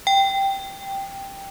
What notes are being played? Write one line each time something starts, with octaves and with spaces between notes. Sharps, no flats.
G5